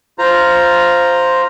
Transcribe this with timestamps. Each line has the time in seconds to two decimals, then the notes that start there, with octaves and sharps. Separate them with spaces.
0.19 F4 C5 A#5